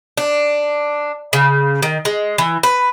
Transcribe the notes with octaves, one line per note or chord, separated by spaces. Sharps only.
D4
C#3
D#3
G#3
E3
B4